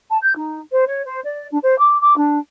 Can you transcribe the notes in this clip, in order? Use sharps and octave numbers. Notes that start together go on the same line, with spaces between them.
A5
G6
D#4
C5
C#5
C5
D5
D4
C5
D6
D6
D4